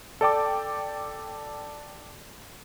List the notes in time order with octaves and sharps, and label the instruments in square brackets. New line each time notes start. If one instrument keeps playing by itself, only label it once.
[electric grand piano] A4 D5 G5 D6